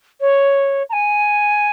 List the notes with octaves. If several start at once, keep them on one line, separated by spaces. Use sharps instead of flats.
C#5
A#5
G#5